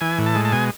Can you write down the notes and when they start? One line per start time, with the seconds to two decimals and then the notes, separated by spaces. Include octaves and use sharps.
0.01 E3 G#5
0.18 A2
0.26 A5
0.35 G#3
0.45 A5
0.52 B2 G#5